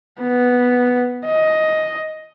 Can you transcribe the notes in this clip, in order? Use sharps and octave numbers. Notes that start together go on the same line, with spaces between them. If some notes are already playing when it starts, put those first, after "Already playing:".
B3
D#5